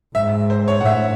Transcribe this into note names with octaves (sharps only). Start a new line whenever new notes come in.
G#2 E5
C5
C#5
F#5
A2 E5